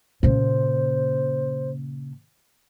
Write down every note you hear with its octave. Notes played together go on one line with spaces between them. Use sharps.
A#2 C#3 C5